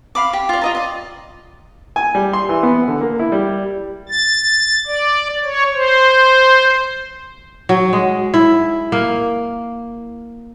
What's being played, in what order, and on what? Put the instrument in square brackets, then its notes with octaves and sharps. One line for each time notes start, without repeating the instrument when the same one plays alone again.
[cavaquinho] F5 B5 D6
G4
F4 D5
F4 D#5 A#5
D5 D#5
[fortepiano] G#5
G3
C6
E3
B3
D3
A#3
E4
G3
[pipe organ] A6
D5
C#5
C5
[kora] F#3
G#3
E4
A#3